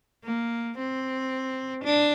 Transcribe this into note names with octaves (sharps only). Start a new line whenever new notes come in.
A#3
C4
D4